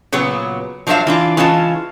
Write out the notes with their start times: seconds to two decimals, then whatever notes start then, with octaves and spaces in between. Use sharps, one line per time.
0.12 A#2 C#3 F#3 B3
0.87 F3 F#3 D4 C5 E5 F5
1.07 E3 D4 F4
1.37 E3 G#3 C#4 F4 A5